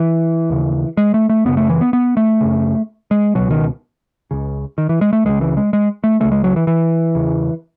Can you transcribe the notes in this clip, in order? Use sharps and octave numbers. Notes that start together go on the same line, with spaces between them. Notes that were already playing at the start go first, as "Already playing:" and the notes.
Already playing: E3
D#2 C#3
G#3
A3
A3
F#2 C#3 B3
A3
E3
B3
B3
A3
F#2 C#3
G#3
C#2 B2 F#3
D#3
C#2 C#3
D#3
E3
G#3
A3
C#2 C#3 G#3
E3
G#3
G#3
A3
C#2 C#3 A3
G#3
F#3
E3
E3
E2 C#3